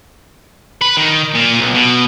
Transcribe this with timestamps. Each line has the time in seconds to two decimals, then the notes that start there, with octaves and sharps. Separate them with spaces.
0.82 B4
0.97 D#3
1.35 A#2
1.59 B1
1.74 B2